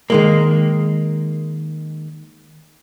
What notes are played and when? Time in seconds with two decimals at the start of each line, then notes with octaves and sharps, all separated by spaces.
0.10 D#3 G#3 A#3